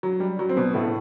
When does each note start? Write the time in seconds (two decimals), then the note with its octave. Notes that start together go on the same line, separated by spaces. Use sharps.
0.03 F#3
0.20 G3
0.39 F#3
0.49 C4
0.56 B2 B3
0.74 A2 A3